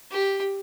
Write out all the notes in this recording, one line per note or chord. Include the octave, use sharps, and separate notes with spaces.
G4